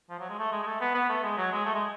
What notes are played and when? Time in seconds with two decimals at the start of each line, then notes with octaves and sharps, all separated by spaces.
0.10 F3
0.19 F#3
0.29 G#3
0.39 A3
0.52 G#3
0.63 G#3
0.66 A3
0.81 B3
0.94 B3
1.09 A3
1.23 G#3
1.37 F#3
1.51 G#3
1.65 A3
1.75 G#3